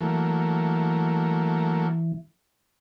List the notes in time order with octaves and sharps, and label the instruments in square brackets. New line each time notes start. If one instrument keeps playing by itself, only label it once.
[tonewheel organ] E3 [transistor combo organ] F#3 A3 A#3